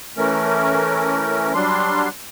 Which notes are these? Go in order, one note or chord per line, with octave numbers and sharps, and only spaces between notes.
E3 A3 C#4 A#4
F#3 G3 D4 C6